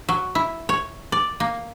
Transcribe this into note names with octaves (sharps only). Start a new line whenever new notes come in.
F#3
E4
C#5
D5
A#3